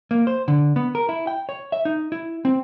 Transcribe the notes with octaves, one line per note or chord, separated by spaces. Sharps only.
A#3
C5
D3
B3
A#4
E4
G5
C#5
E5
D#4
E4
C4